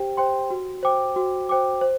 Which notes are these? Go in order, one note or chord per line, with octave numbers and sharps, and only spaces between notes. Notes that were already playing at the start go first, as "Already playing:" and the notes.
Already playing: G4 C5 G5
C5 G5 C6
F#4
C5 G5 D6
F#4
C5 G5 D6
C5